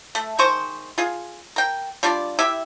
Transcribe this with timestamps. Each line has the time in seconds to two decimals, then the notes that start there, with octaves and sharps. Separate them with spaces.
0.15 A3
0.39 D#3 G#3 C5 C#6
0.98 F4 G#4
1.56 A#4 G5
2.03 G3 D4 F4 D5
2.39 E4 G4 E5